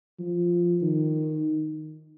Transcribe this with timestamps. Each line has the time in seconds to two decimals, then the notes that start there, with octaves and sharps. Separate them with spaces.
0.19 F3
0.82 D#3